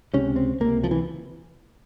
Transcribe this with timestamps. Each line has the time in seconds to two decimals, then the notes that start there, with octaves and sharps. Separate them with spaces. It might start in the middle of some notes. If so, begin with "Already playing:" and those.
0.14 C#2 C3 C#4
0.36 C4
0.60 C#2 C3 A#3
0.84 F3
0.91 E3